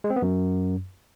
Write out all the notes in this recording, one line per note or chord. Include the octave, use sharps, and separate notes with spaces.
G#3
C4
B3
F#2